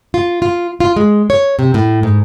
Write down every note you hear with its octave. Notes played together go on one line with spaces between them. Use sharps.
F4
F4
F4
G#3
C#5
C3
A2
G#2